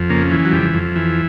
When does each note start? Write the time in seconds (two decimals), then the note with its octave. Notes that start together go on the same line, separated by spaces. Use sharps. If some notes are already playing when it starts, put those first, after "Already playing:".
Already playing: F2
0.10 C#3 A#3
0.31 E3
0.45 F#3
0.53 F2 G3
0.74 F2
0.96 E3